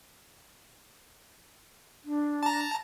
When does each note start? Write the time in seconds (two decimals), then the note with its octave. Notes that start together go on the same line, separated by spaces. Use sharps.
2.04 D4
2.43 A5 A#5